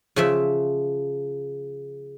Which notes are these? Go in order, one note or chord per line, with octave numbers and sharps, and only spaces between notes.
C#3 F3 E5